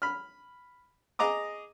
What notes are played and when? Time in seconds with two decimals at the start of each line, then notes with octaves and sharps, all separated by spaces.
0.02 B5 F6
1.19 G#4 D#5 A#5 D6 D#6